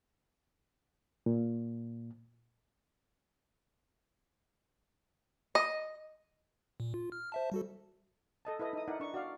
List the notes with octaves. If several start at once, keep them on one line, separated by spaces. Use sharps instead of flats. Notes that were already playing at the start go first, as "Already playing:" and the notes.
A#2
D#5
A#2
F4
F6
C5 E5 A5
G3 F#4 A4
A4 D#5 A5
E4 A4 B4 D#5
D#4 D#6
D#4 E4 A#4 D5 F#5
D4 C#6
F#4 D5 F5